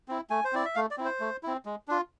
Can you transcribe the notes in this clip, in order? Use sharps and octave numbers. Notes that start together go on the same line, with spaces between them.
C4 E4
A3 G#5
C5
C4 E4 D5
E5
A3 F5
D5
C4 E4
C5
A3
C4 E4
G#3
D4 F4